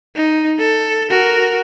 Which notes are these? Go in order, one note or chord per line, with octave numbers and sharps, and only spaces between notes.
D#4
A4
F#4 A#4